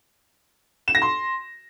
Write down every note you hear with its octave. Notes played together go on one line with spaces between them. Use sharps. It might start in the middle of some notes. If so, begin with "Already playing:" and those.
E7
A#6
C6